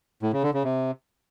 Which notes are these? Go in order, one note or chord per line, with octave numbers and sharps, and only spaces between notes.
A2
C#3
D3
C#3
C3